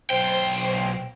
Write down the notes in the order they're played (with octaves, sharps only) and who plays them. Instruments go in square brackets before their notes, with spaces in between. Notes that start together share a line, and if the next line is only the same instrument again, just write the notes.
[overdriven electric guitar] B1 G5 [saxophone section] C5